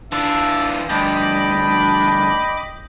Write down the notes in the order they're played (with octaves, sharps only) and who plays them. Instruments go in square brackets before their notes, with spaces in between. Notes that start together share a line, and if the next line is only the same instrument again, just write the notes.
[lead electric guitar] E3 F4 [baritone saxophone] D4 [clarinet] E5
[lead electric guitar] D2 G2 [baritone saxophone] D4 [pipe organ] D#5 B5 D6 [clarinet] G5